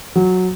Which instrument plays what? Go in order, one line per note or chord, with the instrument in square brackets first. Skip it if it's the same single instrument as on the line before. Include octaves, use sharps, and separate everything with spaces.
[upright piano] F#3